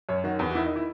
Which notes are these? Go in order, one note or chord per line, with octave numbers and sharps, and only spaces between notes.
F#2 C#5
D#3 F#4
E2 F#4
F#4
D#3 E4
D#4
E4